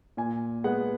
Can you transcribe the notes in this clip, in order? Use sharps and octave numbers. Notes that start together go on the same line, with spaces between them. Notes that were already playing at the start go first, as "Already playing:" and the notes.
A#2 G#5
G#3 B3 F#5